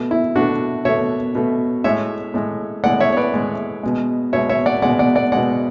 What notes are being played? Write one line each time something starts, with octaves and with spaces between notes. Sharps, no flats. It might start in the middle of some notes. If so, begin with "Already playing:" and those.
Already playing: B2 A3
E4
B2 A3 D4 F#4
B2 A3 C#5 E5
B2 A3
A2 G#3 C#5 E5
A2 G#3
A2 G#3 D5 F#5
C#5 E5
C#5
B4 D5
A2 G#3
B2 G#3
B2 G#3 C#5 E5
C#5 E5
D5 F#5
B2 G#3 D5 F#5
D5 F#5
D5 F#5
B2 G#3 D5 F#5